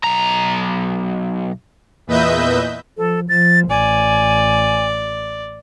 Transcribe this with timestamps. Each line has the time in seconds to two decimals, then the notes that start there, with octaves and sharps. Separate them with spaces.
0.04 B1 A#5
2.07 E2 A#2 B4 D#5 E5 G6
2.98 F3 A4
3.29 F3 A6
3.70 A1 D5 G#5